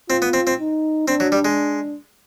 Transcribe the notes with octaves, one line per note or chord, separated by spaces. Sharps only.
C4 F4
B3
C4
C4
D#4
C4 D4
F#3
G3
G#3